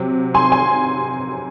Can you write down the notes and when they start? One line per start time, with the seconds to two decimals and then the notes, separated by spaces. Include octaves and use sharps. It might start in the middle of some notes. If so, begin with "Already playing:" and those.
Already playing: C3 F#3
0.34 G#5 C6
0.52 G#5 C6